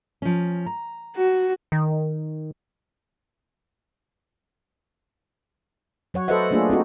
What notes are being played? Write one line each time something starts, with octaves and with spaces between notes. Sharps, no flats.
F3 C#4
A#5
F#4
D#3
F#3 C#5 F#5
A4 B4 C5 D#5 E5 F#5
A3 A#3 D4 F4 G#4
C4 D#4 F#4